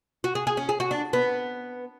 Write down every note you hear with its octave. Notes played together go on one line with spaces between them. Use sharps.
F#4
G#4
G#4
C#4
G#4
F#4
D4
B3